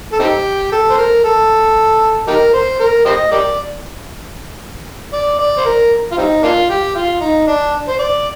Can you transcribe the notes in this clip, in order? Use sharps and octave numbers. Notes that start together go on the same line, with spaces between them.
A4
C4 D#4 G4
A4
C5
A#4
A4
D#4 G4 A#4
C5
A#4
G4 C5 D#5
G4 A#4 D5
D5
D5
C5
A#4
F4
G3 C4 D#4
A#3 D4 F4
G4
F4
D#4
D4
C5
D5